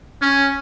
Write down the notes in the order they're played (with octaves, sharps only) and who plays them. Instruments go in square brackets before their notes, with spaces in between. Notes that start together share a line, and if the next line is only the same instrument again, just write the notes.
[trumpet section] C#4